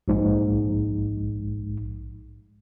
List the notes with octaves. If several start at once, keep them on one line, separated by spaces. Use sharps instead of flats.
A#1 G#2